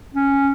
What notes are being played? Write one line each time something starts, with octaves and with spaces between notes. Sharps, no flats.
C#4